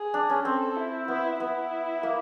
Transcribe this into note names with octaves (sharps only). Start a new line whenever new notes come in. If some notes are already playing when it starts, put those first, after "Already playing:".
Already playing: G#4
D4
C#4
C4 A4
E4
B3 E4
B3 E4
A#3